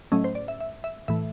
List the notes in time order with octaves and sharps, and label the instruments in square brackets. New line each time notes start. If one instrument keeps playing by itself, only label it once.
[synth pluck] A2 F#3 A3 C#4 D#5
C5
D5
E5
E5
E5
A2 E3 A3 E5